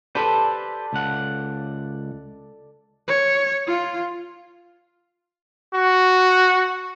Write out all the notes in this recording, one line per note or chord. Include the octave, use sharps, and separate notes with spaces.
G4 A4 B4 C5 D5
C#2 F#5
C#5
F4
F#4